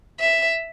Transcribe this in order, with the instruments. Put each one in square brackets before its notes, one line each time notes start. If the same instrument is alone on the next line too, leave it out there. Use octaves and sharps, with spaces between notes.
[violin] E5